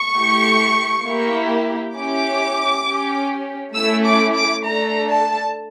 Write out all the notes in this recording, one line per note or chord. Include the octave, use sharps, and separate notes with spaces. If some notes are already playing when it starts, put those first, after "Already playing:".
Already playing: C#6
A3 E4 G4
A#3 E4 G4
C#4 E4 G4 D6
C#4 G4
A3 C#4 E4 E6
D6
D6
A3 D4 A4 A#5
A5